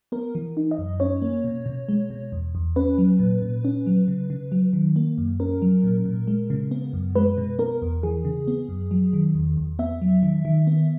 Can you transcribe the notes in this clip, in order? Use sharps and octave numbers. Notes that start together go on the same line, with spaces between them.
B3 A#4
E3
D#4
D#5
F#2
C#4 C#5
A#3
B2
B2
G#3
B2
E2
E2
C#4 B4
F#3
A#2
A#2
C#4
F#3
C#3
C#3
F#3
D#3
A#3
F#2
C#4 A#4
F#3
A#2
A#2
G#3
C#3
B3
F#2
G#3 B4
B2
B3 A#4
E2
E3 G#4
C#3
B3
F#2
F#3
D#3
E2
E2
B3 E5
F#3
D#3
D#3
B3